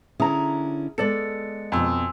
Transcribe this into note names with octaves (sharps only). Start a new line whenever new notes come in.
D3 C#4 E4 G#4 A#5
G#3 B3 A4 D5 A6 C#7
F2 B2 G#5 C6 E6